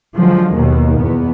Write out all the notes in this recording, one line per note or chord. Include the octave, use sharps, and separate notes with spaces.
D3 F3 F#3 G#3
D#2 B2 D#3
E2 B3